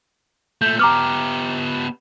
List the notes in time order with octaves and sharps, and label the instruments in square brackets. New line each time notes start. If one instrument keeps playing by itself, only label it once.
[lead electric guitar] A#2 A3 [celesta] G6
[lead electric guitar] B3 G4 [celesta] A#5 D6 F6